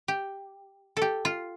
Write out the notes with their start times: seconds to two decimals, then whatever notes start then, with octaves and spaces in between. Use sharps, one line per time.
0.08 G4
0.97 G4 A4
1.25 F4